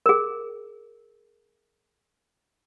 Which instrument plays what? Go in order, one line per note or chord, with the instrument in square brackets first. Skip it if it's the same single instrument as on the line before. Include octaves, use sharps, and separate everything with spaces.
[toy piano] G#4 A#4